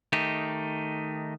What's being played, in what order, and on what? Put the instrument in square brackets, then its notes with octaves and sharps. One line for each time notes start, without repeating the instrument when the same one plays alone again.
[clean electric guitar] D#3 A3 D#4 G4